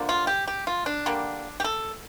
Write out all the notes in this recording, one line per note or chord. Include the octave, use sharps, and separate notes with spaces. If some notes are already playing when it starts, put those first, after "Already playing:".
Already playing: D3 F3 A#3
F4
G4
G4
F4
D4
D3 G3 A#3
G4
A4